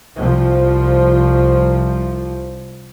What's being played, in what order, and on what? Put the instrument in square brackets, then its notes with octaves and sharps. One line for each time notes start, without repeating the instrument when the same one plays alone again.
[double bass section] C2 F3